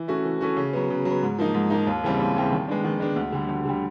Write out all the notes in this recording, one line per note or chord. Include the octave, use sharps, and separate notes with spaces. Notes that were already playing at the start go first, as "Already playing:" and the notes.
Already playing: E3
A3 C#4 F#4
E3
A3 C#4 F#4
C#3
F#3 B3
C#3
F#3 B3
G#2
F3 A#3 D#4
G#2
F3 A#3 D#4
D#2
C#3 E3 G3 C4
D#2
C#3 E3 G3 C4
D#3
G#3 B3 D4
D#3
G#3 B3 D4
D2
D3 G3
D2
D3 G3